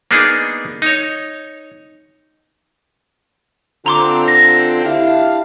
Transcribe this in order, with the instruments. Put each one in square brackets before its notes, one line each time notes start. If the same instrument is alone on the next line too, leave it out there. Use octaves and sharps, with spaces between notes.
[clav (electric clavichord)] A#3 B3 D4 D#4 G#4
D#4 C#5
[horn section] D3 C4 [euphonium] F4 [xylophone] A#5 C6 D6
[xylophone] A#6
[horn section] D4 G4 F5 [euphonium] E4